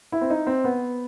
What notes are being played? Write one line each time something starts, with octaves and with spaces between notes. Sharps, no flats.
E4
C4
D#4
C4
B3